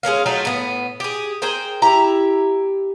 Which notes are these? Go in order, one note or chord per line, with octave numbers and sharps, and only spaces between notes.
G#3 C#4 A#4 F5
F#3 A3 D#4 F4
A2 B3
G4 G#4
G#4 A#4 C5 G5
E4 G4 A#5